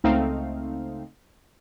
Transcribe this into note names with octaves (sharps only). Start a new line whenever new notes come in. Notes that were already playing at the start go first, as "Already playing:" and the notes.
C#2 A3 C4 D#4 F5